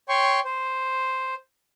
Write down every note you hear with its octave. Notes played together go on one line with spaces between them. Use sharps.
C#5 G5 C6 C#6
C5